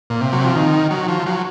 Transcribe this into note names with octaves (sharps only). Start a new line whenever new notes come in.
A#2
C3
F#3
F3
D#3
F#3
F3
F#3